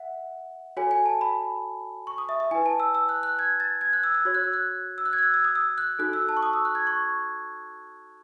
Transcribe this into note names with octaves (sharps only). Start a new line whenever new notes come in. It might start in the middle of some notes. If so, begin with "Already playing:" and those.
Already playing: E5 F#5
F#4 A4 C#5 G#5
G#5
A5
B5
C#6
D#6
E5
E5
E4 B4 G#5
A5
E6
E6
F#6
F#6
G#6
A6
G#6
F#6
E6
E6
F#4 C#5 G#6
F#6
E6
F#6
E6
F#6
G#6
F#6
E6
E6
D#6
E6
F#6
D#4 F#4 A4 F#6
E6
A5
C#6
D#6
E6
F#6
G#6
C#6